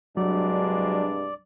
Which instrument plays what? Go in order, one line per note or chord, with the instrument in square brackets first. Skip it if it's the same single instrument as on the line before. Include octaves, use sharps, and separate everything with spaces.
[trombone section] C2 G#3 D4 [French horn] G2 [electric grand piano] F#3 [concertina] D5